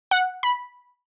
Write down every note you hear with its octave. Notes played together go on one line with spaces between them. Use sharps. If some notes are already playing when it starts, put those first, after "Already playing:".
F#5
B5